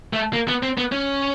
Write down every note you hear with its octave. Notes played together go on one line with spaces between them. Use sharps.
A3
A#3
B3
C4
B3
C#4